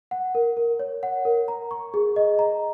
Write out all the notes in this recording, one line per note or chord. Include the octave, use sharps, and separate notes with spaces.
F#5
A#4
A#4
C#5
F#5
A#4
A#5
C#6
G#4
D#5
A#5